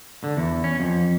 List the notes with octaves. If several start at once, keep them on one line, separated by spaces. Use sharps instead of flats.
D3
E2
C#4
F2